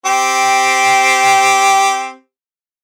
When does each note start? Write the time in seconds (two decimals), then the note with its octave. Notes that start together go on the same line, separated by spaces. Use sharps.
0.06 C4 G4